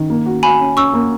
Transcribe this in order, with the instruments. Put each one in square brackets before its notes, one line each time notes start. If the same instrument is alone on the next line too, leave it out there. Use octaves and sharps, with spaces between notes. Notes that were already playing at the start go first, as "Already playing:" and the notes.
Already playing: [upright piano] D#3
A#3
F#4
[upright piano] F#4 [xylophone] G#5 B5
[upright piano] C#4
[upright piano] C#4 [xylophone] C#6 E6
[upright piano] A#3